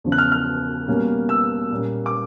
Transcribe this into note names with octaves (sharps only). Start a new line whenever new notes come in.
E2 C#3 F3
F#6
F6
F6
B2 G3 A#3 C#4
E6
A#2 G3 A#3 C#4
D6